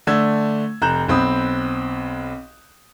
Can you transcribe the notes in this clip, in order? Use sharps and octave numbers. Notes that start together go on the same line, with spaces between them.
D3 A3 D4 E6 G#6
F1 A#5 F#6 G6 E7
B1 C4 B5 D#6